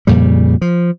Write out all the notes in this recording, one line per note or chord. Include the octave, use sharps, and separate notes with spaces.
F2 A#2 C#3 G3
F3